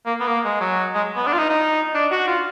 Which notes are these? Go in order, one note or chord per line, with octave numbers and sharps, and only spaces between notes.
A#3
B3
A#3
G#3
F#3
G#3
B3
D4
F4
D#4
D#4
D4
F#4
F4